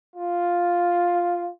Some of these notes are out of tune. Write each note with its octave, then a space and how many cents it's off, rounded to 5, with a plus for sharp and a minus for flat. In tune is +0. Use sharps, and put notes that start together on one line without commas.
F4 +5